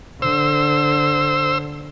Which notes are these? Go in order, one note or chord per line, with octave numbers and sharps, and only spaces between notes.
D3 C5 E6